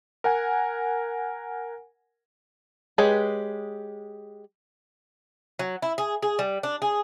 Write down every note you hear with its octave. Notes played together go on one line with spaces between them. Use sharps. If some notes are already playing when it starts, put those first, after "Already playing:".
A#4 F#5 G#5
G#3 G4 G#4 B4 C#5
F#3
E4
G#4
G#4
G3
D4
G#4